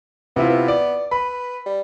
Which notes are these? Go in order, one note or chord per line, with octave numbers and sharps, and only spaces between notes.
C3 B3 E4 F4
B3
D5
B4 B5
G3